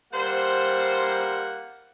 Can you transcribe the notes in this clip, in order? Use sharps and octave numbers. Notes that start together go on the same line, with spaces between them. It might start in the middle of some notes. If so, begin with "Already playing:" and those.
G3 A#3 C5 F#5